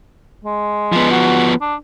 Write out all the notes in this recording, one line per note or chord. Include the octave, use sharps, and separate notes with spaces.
G#3
F3 B3
F#4
D4